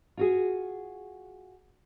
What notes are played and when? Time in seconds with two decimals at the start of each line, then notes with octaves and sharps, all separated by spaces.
0.17 F4 F#4 G#4